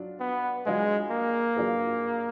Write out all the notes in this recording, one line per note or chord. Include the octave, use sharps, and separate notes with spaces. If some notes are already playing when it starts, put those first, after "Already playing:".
Already playing: F#3 D4 F4
B3
F#3 G#3 D4 F4 G#4 B4
A#3
F#3 D4 F4 G#4 B4